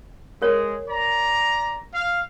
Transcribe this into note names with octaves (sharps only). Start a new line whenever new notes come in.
G#3 G#4 A#4 C#5
D5 A#5
F5